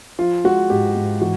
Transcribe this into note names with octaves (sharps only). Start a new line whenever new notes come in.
F3 F4
G#3 F#4
G#2 G4
G#2
E3 F#4